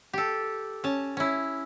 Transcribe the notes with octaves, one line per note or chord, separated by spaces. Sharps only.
G4 A4
C#4 A5
C#4 E4